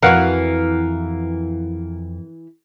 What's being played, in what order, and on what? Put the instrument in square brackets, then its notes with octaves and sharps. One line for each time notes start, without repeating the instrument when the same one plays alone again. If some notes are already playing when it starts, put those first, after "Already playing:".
[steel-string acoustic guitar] F2 [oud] E3 F#4 [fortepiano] A#4 F5 F#5